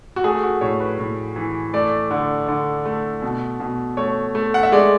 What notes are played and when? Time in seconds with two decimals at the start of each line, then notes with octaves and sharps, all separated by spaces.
0.16 F#4
0.24 A3 G#4
0.43 F#4
0.61 A2 C#5
0.80 B4
0.99 A2
1.36 E3
1.74 A3 D5
2.11 D3
2.48 D3
2.85 A3
3.22 B2
3.60 B2
3.97 A3 C#5
4.35 A3
4.54 F#5
4.63 E5
4.72 G#3 D5